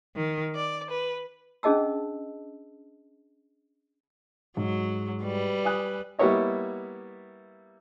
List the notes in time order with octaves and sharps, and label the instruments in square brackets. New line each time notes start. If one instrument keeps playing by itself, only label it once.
[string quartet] D#3
D5
B4
[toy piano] C#4 D4 G#4 D#5 A5 E6
[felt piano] G#2 [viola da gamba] F#3
[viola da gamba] G3 B4
[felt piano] G#5 D#6 F#6
[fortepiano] G3 A#3 B3 E4 C#5 D#5